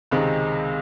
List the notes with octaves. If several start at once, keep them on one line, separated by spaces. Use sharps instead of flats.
C#2 C3 D#3 G#3 C4